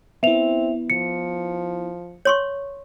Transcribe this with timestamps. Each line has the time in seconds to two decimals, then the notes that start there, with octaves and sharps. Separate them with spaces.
0.23 B3 C4 E4 E5 F7
0.90 F3 C#7
2.25 C#5 C6 C#6